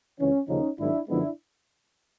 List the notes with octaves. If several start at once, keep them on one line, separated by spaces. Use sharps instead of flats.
C#2 C#3 E3 C#4
D#2 C#3 F3 A#3 C#4 D#4
G#1 G#2 D#3 F#3 D4 E4
F#2 D3 F3 G#3 B3 D4 E4